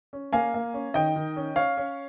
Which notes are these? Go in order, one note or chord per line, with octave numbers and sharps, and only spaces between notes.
C#4
A#3 F5 G#5
A#3
C#4
D#3 D#5 G5
D#3
C#4
C#4 C#5 F5
C#4